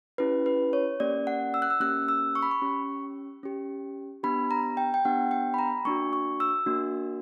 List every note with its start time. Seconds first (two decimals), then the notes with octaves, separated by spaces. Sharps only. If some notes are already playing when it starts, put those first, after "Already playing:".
0.18 C#4 E4 G4 B4
0.46 B4
0.73 C#5
1.00 A#3 C#4 G4 D5
1.27 F#5
1.54 E6
1.62 F#6
1.70 E6
1.80 A#3 C#4 G4 F#6
2.08 E6
2.35 C#6
2.43 B5
2.51 C#6
2.62 C#4 G4
3.43 C#4 G4
4.23 B3 D4 G4 B5
4.51 A#5
4.77 G5
4.94 G5
5.05 B3 D4 G4 F#5
5.31 G5
5.54 B5
5.59 A#5
5.85 A#3 D4 F#4 C#6
6.13 C#6
6.40 E6
6.66 A#3 D4 F#4